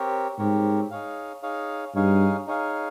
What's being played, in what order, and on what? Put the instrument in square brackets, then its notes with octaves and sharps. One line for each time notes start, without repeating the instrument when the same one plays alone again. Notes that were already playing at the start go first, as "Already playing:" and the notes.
Already playing: [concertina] C4 G4 A#4 C#5
[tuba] G#2 [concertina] C4 G4 A#4 C#5
[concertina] D#4 G#4 C#5 F5
D#4 G#4 C#5 F5
[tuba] G2 [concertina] D#4 G#4 C#5 F5
[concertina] D#4 G#4 C#5 F5